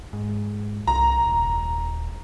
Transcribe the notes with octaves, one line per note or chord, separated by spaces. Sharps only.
G#2
C2 A#5
D#1